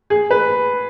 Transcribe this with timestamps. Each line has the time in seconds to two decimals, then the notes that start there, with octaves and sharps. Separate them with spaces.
0.10 G#4
0.31 B4